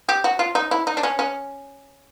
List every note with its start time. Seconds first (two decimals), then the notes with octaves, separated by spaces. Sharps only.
0.09 G4
0.24 F#4
0.39 F4
0.55 D#4
0.71 E4
0.87 D#4
0.97 D4
1.03 C#4
1.19 C#4